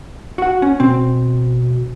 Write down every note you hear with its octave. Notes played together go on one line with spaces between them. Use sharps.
F#4 F#5
C#4
B2 C4